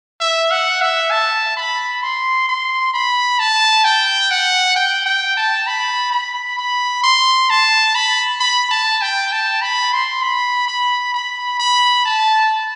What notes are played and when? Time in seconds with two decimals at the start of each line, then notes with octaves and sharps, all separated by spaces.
0.20 E5
0.51 F#5
0.81 E5
1.11 A5
1.57 B5
2.03 C6
2.49 C6
2.94 B5
3.39 A5
3.85 G5
4.31 F#5
4.76 G5
5.06 G5
5.37 A5
5.67 B5
6.12 B5
6.59 B5
7.04 C6
7.50 A5
7.95 B5
8.40 B5
8.71 A5
9.02 G5
9.32 A5
9.62 B5
9.93 C6
10.23 B5
10.68 B5
11.14 B5
11.60 B5
12.05 A5